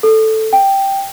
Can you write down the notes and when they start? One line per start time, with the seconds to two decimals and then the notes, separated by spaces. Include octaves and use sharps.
0.03 A4
0.53 G5